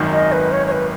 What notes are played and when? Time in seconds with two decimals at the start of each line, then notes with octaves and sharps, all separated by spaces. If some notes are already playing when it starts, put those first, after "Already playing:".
Already playing: G#1 F#2 D#3
0.13 D#5
0.32 B4
0.52 C#5
0.67 C#5
0.72 B4